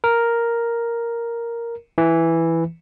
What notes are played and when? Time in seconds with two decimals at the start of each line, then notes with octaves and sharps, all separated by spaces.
0.04 A#4
1.98 E3